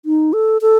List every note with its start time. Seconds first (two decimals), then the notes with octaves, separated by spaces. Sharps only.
0.05 D#4
0.33 A4
0.62 A4